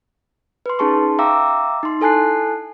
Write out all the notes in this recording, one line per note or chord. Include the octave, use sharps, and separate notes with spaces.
B4 C6
C#4 D#4 G#4 A5 C6 C#6
E5 F5 G5 A#5 D6 E6
D#4 C6
E4 A4 G#5 A5 F#6 C7